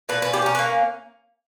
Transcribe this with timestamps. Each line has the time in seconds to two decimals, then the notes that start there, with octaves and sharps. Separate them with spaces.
0.09 A#2 B4
0.22 C#4 B4
0.33 G4
0.42 C#4 A#4
0.55 B4
0.59 A#3